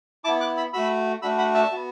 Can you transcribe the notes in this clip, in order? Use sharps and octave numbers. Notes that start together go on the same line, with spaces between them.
B3 E4 A5 D6
D6 F#6
B5 E6
A3 F#4 B5 E6
A3 D4 F#4 B5 E6
F#5 B5
E5 A5
B3 F#4